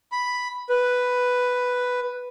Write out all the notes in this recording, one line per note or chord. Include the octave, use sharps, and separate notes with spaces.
B5
B4